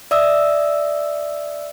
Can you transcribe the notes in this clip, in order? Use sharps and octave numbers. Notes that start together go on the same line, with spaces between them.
D5 E5 D#6 E6